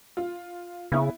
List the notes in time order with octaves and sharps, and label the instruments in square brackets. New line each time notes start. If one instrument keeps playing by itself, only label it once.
[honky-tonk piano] F4
[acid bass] C#3 [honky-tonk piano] B3 E4